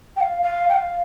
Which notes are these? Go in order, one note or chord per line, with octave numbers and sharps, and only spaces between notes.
G5
F5
F5
G5
F5